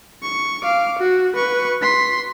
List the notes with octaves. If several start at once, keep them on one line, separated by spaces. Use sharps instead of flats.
C#6
F5 D6
F#4
B4 C#6
C6 B6